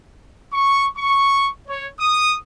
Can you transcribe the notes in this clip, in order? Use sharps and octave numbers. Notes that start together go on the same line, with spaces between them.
C#6
C#6
C#5
D#6